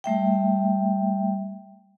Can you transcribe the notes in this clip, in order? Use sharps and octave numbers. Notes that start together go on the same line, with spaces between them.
G3 A3 E5 G5